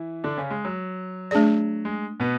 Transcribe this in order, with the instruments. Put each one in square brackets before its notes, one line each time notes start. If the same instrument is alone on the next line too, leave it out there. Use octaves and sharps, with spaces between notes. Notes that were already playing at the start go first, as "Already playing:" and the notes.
Already playing: [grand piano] E3 E4
D3 D4
C#3 C#4
G#3
F#3
[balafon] A3 D4 G#4 D5
[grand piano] G#3
B2 B3